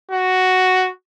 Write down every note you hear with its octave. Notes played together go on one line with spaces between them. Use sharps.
F#4